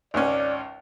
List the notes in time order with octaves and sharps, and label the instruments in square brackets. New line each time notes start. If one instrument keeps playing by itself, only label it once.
[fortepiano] G#1 C#2 C#4 [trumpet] D5